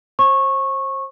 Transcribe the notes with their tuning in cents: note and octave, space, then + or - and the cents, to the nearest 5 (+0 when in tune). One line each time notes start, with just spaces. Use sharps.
C5 +35 C#6 -15